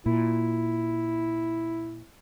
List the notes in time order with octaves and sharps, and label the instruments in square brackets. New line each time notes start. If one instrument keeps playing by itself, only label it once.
[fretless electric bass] A#2 [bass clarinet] E4